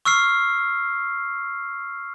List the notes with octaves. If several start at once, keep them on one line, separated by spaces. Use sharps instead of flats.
C#6 E6 F6 C7